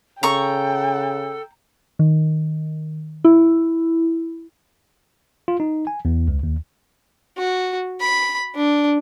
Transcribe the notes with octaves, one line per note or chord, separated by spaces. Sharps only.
C#3 A4 G5 A#5 C#6
D#3
E4
F4
D#4
G#5
E2
C#2
D#2
F#4
B5
D4